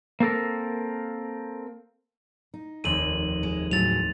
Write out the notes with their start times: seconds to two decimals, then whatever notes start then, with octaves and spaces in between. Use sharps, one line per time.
0.20 A#3 C4 A4 A#4
2.54 D#4
2.84 F1 D#2 C4 D#7 F#7
3.43 G#3
3.71 A2 F#3 G#3 A6 F7